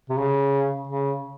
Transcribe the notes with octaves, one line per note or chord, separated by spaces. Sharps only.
C3
C#3
C#3